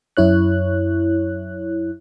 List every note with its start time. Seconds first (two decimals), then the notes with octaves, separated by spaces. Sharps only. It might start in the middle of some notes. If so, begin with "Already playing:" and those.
0.17 F#2 E4 C#5 F#6